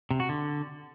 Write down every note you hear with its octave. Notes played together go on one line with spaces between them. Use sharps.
C3
F#4
D3